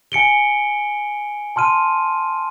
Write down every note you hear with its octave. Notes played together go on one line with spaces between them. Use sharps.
G#5 C#7 D7 G7
A5 C6 F6 D#7